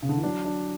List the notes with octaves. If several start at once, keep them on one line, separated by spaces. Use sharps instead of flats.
C#3
D3
E3
F#3 D4
D4